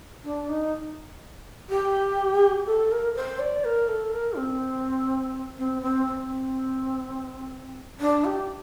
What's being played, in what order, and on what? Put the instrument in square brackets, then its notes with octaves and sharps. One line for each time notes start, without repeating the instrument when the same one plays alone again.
[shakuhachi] D4
D#4
G4
A4
A#4
C5
D5
A#4
A4
A#4
C4
C4
C4
C4
D4
G4